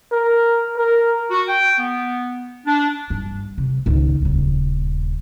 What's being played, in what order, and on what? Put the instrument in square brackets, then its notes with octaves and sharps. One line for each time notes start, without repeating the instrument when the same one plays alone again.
[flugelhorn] A#4
A#4
[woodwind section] F#4
G5
B3
D4
[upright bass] G2
C3
C#2 D#3
D#1 C#3